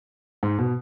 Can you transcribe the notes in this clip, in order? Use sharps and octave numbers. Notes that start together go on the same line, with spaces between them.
G#2
B2